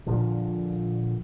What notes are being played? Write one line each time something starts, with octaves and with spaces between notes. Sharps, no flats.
A#1 A#2 D3 F3